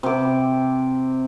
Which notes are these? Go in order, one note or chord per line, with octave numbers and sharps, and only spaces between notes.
C3 D6